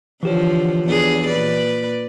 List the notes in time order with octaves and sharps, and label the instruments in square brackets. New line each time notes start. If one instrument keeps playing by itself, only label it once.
[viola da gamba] D3 F3 [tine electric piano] E3 G4 C#5
[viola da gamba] E2 D4 G#4
A#2 B4 D5